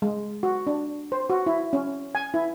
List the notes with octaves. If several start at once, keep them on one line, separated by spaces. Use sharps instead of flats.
G#3
F#4
D4
C5
F#4
E4
C#4
G#5
E4